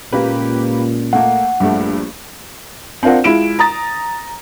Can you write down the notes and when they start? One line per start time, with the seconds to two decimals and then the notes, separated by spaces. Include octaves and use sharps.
0.12 C#2 A#2 A#3 G4 B4
1.13 A3 A#3 F#5
1.60 A#1 G2 A3
3.03 C4 D4 F4 A#4 F#5
3.24 G#3 E4 F4 D7 E7
3.59 A#5 D#6 A6